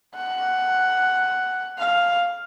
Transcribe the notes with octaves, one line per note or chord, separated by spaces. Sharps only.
F#5
F5